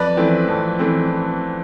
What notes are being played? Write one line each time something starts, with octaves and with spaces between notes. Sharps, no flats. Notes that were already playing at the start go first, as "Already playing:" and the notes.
Already playing: F2 B4 D5
E3 A3 C4
F2
E3 A3 C4